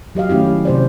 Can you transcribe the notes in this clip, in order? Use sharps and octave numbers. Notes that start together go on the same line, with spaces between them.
F#3 G4 D#5 F5
D#3 A3 C#4 E4 G4
C3 C5 D5